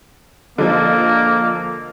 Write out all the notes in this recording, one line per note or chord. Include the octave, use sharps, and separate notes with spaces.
D3 F3 G#3 A#3